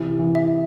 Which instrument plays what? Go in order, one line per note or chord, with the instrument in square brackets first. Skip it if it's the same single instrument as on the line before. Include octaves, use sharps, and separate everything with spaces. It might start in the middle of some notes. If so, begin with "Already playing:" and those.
Already playing: [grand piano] C3 E3
E3
[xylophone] E5